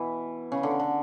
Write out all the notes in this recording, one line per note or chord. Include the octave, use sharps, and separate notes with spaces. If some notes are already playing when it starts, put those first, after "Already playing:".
Already playing: B2 E3
C#3
D3
D3